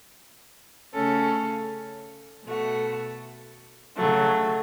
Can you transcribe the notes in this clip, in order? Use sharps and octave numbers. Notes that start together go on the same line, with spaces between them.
C#3 A3 C#4 A4
B2 A3 F#4
C#3 F#3 A3